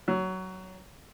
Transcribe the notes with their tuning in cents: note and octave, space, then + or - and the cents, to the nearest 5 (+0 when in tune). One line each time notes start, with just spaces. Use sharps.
F#3 +15